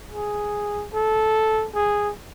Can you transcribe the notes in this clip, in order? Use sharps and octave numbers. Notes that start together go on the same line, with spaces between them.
G#4
A4
G#4